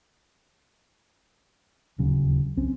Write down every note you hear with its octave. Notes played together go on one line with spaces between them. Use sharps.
D1 D#2 C#3 F#3
C2 C4 C#4